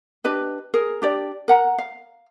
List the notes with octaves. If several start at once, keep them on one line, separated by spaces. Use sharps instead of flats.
D4 G4 B4 D#5
G#4 A#4
D4 G4 D5
A#4 F#5 A#5
F5